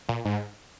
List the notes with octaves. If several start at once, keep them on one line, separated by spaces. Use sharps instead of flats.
A#2
G#2